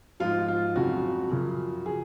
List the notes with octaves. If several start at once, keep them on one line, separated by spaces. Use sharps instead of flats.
G#2 F3 F4
F4
F2 C#3 F#3 F#4
F#2 C#3 F3
F3 G#4